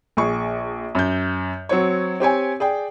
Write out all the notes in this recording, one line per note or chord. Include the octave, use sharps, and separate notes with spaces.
A#1 G#4 C#6
F#2 G6
F#3 C4 C#5
C4 G4 C#5 G#5
G#4 D5 G5